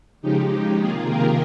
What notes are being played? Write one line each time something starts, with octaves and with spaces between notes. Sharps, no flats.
C#3 F3 G#3 D#4 G4
C3 D#3 A#3 F4 G#4
G4 A#4